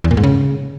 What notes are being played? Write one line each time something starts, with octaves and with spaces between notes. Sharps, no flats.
E2
A#2
G#2
C#3